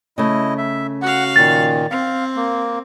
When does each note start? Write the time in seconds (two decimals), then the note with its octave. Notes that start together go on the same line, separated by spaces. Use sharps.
0.18 C#3 A3 E4 D#5
0.58 E5
1.02 F#4 F5 F#5
1.36 A#2 D#3 A6
1.91 C4 F5
2.36 A#3